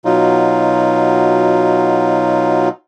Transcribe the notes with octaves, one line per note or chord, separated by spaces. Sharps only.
B2 F#3 D#4 F4